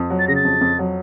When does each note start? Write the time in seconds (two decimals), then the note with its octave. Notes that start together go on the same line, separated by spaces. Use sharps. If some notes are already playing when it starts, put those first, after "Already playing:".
Already playing: F2
0.10 F#3
0.19 A6
0.28 C#3 A#6
0.36 A6
0.45 F2
0.61 F2
0.79 F#3